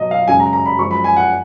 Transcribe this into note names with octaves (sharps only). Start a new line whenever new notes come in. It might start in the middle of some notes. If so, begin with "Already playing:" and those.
Already playing: B2 F#3 D#5
F5
F#2 C#3 G#3 G#5
A#5
A#5
B5
F#2 F3 G#3 C#6
B5
G#5
F#5